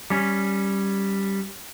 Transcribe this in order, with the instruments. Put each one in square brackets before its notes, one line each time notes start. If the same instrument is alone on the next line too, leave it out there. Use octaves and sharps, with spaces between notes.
[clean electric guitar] G3 C#4